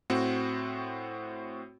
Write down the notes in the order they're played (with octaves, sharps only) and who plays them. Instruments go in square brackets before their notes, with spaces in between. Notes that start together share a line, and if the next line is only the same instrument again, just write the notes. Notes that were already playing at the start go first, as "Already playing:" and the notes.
[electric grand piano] A2 C4 F#4